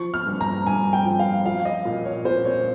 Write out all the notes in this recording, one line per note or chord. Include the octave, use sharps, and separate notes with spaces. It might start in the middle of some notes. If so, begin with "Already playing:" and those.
Already playing: F3 C#6
F6
G2
A#5
G2 G#5
G5
F3
F5
F3 F5
D#5
A#2
C#5
A#2 C5
C#5